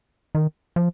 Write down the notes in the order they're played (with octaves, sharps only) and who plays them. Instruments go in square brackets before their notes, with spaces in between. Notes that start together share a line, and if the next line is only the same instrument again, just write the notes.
[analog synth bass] D#3
F3